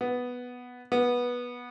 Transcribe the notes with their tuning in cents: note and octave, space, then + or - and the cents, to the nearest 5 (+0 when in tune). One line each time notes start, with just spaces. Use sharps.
B3 +0
B3 -15